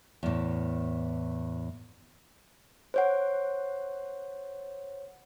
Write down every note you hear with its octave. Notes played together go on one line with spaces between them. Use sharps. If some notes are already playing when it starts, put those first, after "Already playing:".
E2 A2
C5 C#5 F#5